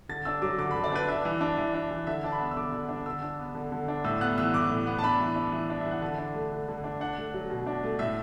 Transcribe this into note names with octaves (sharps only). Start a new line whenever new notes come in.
D3 A6
D4 E6
F#3 D6
D3 D6
D3 B5
D5
D4 B4
D4 E5
E3
D4
E3
D4
E3
D3 E5
D4 A5
B5
B3
E6
D3 D6
D3
D4
D3 E6
D4
B3
D3
D3
D4
A2 E6
B3 F#6
E3 E6
A2 D6
A2
B3
A5
D4 B5
E3
D4
E3
D4
E5
E3
F#5
D3 A5
D4
A3
D3
D3
D4
D4 F#5
A3
F#3
B2
D4
A3
A2 E5